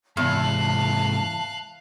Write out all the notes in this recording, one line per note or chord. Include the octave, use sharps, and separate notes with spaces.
E2 G#2 C3 F5 A5 F#6